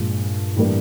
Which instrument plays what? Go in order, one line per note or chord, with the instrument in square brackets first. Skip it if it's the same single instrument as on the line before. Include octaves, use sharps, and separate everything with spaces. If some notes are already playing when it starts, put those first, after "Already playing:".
Already playing: [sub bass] G2 [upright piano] A#2 F3 G#3
[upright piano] A2 E3 G3 A#3 D4